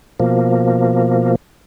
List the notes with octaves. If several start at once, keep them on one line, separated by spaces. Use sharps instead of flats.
B2 F3 A#3